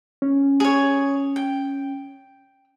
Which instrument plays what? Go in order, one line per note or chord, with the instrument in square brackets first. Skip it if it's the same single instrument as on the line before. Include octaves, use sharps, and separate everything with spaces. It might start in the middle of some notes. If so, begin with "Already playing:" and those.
[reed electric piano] C#4
[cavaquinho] G#4 C#5
G5